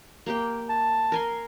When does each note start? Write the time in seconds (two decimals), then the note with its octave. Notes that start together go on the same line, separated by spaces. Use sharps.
0.26 A#3 G4 G5
0.69 A5
1.12 A#4 G#5 C6